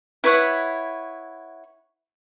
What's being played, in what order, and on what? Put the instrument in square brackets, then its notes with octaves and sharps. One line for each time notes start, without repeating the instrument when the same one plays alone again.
[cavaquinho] E4 B4 C#5 F#5